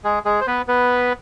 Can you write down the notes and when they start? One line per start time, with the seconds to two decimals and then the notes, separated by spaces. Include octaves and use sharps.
0.04 G#3 G#4
0.25 G#3 G#4
0.41 C5
0.47 B3 B4
0.68 B3 B4